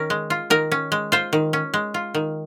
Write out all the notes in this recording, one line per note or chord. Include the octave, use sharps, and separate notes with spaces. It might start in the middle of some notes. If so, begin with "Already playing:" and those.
Already playing: D#3 C#4 A#4
G#3
F4
D#3 A#4
C#4
G#3
F4 C5
D#3
C#4
G#3
F4
D#3